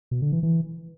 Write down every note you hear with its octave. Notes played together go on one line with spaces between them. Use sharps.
B2
D3
E3
E3